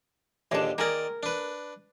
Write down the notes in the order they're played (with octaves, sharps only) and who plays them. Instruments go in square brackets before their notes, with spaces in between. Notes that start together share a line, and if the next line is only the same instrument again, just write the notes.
[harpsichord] A#1 D#2 D3 [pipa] G#3 D4
[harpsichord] D#3 D5 [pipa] A#3 G#4 A#4
[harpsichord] D4 B4